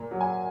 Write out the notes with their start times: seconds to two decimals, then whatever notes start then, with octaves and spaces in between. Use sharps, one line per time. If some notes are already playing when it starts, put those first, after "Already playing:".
Already playing: A#2 A#5
0.11 F#3
0.21 G#5